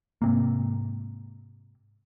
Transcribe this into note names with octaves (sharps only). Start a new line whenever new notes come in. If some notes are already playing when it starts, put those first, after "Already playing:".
G#2 C3 A#3